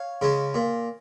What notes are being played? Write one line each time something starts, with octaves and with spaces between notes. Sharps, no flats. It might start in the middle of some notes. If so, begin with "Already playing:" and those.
Already playing: C#5 F5
C#3 G#3
A#2